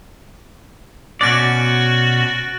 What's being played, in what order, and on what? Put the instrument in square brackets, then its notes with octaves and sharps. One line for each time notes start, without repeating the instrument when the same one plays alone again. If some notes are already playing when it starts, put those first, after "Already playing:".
[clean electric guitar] B2 C#4 D5 [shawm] F#4 [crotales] F#6 A6 D7